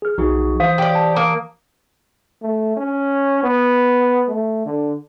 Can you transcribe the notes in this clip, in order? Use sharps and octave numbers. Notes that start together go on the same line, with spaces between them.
G#4 F6
B1 F3 D#4 F#4 G#4
E3 C5 F5 D#6
G4 D5
A5
A#3 D#6
A3
C#4
B3
A3
D3